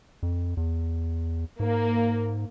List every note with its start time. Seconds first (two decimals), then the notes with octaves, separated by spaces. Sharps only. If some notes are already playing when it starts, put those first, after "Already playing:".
0.23 F2
0.57 E2
1.60 G#2 A#3